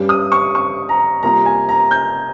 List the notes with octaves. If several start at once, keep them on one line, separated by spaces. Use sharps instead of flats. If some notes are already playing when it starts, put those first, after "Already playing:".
Already playing: G2 G3 C#4
D#6
C#6
C#6
A#5
C3 G3 A#3 F4 A#5
G#5
A#5
G6